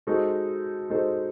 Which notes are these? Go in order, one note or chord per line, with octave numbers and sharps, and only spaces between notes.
G#3 D#4 F#4 A4 C5
G#3 D#4 F#4 A4 C5